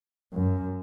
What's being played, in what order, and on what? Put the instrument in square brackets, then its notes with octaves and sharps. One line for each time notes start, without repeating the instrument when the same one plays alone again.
[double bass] F#2